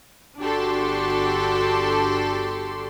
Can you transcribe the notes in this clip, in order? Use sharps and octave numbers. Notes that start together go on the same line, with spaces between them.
G1 D4 F#4 G4 A4 C6